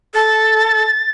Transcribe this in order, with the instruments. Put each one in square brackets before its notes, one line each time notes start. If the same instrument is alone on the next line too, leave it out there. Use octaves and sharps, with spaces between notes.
[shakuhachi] A4 [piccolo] A6